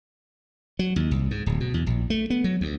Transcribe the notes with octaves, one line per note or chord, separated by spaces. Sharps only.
F#3
D#2
C2
G#2
D1
B2
E2
A#1
A3
B3
F#3
D2